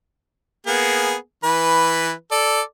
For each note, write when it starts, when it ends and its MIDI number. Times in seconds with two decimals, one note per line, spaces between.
0.67 1.15 58
0.67 1.15 59
0.67 1.15 68
1.44 2.11 52
1.44 2.11 71
2.31 2.61 69
2.31 2.61 74